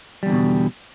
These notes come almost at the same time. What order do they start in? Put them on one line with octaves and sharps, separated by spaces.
G3 E2 D3 B2